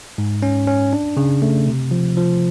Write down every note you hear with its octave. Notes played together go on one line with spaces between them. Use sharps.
G#2
C#4
C#4
D4
C#3
A3
C3
F3
F3